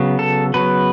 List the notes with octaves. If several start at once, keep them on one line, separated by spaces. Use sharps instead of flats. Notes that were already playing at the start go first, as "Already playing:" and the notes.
Already playing: C#3 F#3 B3
A4
C#3 F#3 B3 B4